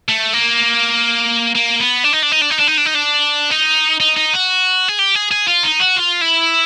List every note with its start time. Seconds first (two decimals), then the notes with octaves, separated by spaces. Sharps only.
0.09 A3
0.33 A#3
1.55 A#3
1.80 B3
2.04 D4
2.13 D#4
2.23 D4
2.31 D#4
2.41 D4
2.50 D#4
2.59 D4
2.67 D#4
2.78 D4
2.86 D#4
2.95 D4
3.51 D#4
4.00 D#4
4.16 D#4
4.33 F#4
4.88 G#4
4.99 G4
5.15 G#4
5.31 G#4
5.48 F4
5.63 D#4
5.80 F#4
5.96 F4
6.21 E4